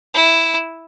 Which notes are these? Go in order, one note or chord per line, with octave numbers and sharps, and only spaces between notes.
E4